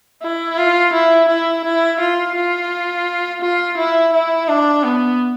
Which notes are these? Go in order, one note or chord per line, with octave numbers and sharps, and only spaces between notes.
E4
F4
E4
E4
E4
F4
F4
F4
E4
E4
D4
B3